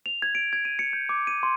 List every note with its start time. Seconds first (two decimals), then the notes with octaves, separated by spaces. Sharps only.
0.06 F7
0.22 G#6
0.35 D7
0.53 G#6
0.65 D#7
0.79 C#7
0.93 G6
1.09 D6
1.27 D#7
1.43 C6